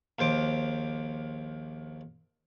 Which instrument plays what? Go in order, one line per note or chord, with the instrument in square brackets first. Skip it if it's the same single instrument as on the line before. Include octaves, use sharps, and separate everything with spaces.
[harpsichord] A#1 D#2 C5 D6